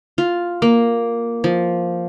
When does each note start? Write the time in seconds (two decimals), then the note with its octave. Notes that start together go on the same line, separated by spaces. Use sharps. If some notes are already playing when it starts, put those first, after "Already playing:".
0.18 F4
0.62 A#3
1.44 F3